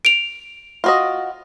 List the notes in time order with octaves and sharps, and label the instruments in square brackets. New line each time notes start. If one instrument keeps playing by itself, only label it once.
[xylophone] D7 F7
[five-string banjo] F4 F#4 D#5